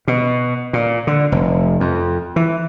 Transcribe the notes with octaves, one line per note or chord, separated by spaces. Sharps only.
B2
A#2
D3
F1
F2
E3